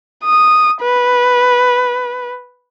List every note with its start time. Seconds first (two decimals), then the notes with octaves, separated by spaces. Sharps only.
0.24 D#6
0.82 B4